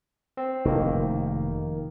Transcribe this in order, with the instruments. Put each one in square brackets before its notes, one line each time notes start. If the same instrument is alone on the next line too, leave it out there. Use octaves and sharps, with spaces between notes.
[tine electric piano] C4
[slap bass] F1 [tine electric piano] D#3 A#3